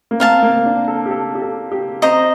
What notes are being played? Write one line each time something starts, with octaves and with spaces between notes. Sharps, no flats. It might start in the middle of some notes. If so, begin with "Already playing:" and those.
A#3
C4 A#4 F5 A5
A#3
D4
A4
G4
A4
G4
A4
G4
C4 C5 D#5 A#5